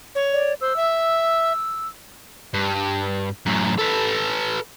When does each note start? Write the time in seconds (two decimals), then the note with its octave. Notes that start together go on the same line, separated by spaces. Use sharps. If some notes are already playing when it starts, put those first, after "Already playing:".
0.15 C#5
0.33 D5
0.61 C5 E6
0.76 E5
2.54 G2
3.46 F#2 A2
3.78 A4 B4